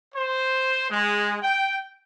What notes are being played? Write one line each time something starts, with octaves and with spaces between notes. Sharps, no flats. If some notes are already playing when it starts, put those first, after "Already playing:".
C5
G#3
G5